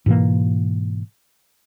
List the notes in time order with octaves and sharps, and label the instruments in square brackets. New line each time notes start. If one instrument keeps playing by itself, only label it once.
[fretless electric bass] G#2 B2 E3 A#3